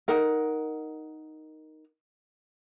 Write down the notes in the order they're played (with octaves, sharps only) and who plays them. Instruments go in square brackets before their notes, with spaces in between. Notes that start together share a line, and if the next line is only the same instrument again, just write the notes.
[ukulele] D#4 A#4 F#5